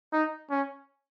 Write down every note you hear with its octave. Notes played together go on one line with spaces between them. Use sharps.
D#4
C#4